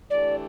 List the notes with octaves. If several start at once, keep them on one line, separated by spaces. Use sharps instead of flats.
E3 A3 D4 G4 D5